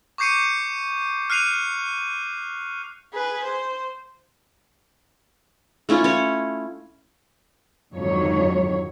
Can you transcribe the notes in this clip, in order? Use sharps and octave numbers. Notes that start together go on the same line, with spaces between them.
C#6 D6 G6 C7 C#7 D#7
F6 F#6 C7 D#7 F7
G#4 B4
C5
A3 C#4 E4 F4
C#4 C#5
F2 G#2 D3 D#3 F#3 C#5